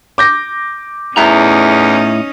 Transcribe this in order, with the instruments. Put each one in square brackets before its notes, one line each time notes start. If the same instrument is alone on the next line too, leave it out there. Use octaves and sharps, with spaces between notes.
[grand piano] D6 G6 A#6
[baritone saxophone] E2 [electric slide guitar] A2 E5 A#5 [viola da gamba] C#4 D#4